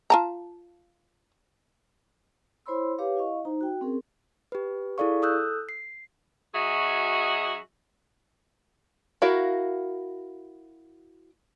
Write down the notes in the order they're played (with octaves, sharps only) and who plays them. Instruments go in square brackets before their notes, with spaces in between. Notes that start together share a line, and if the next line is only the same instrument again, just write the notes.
[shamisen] F4 A5 A#5
[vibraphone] E4 C5 C#5 B5 C6 E6
G4 B4 C#5 F5 D6
E4 D#5 F5 C#6
D#4 C5 A#5
F#4 G5
C4 C#4 G#4 A#4
[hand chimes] G4 B4
E4 G#4 A4 D5 F5 C#6
A4 D#6 E6 F#6 G6
C7
[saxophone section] F#3 C#4 F#4 G#4 D#5 E5
[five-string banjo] E4 F#4 A#4 F5